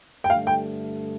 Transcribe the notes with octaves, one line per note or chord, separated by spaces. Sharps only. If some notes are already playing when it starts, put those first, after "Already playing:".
G5
G2 D3 A3 F5
G5